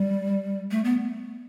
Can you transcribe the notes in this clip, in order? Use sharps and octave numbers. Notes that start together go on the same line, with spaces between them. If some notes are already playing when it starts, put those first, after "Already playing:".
Already playing: G3
A3
B3